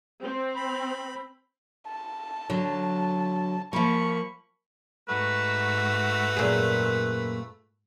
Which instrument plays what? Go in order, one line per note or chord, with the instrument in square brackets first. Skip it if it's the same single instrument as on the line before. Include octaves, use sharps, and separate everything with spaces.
[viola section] C4
[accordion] B5
[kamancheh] A5
[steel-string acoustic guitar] D3 F#3
[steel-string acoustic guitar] F3 A#3 [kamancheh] B5 C#6
[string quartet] G#2 F#4 E6 [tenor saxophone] A3 [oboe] B4
[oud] F#2 A#2 G#4